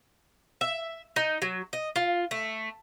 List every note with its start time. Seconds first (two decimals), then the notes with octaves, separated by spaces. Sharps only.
0.61 E5
1.16 D#4
1.42 F#3
1.73 D#5
1.96 F4
2.31 A3